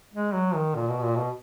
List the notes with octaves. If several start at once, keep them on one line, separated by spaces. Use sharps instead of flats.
G#3
F#3
D#3
A#2
B2
A#2
B2